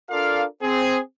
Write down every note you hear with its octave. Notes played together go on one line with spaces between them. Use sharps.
D4 F4 A4 A#4 D5 F5
C4 G#4